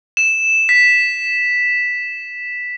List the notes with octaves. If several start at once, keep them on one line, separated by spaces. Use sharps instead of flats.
E7
B6